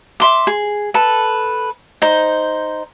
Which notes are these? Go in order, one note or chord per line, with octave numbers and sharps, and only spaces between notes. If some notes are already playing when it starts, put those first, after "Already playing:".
E5 C6 D6
G#4
A4 B4
D#4 C5